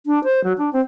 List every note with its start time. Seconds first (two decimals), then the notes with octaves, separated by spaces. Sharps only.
0.06 D4
0.24 C5
0.44 F#3
0.58 D4
0.73 C4